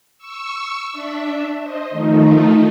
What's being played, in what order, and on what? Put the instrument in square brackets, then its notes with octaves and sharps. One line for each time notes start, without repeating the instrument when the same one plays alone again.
[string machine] C#6 E6
D4 E5
C5 D#5
D#3 F3 A3 D#4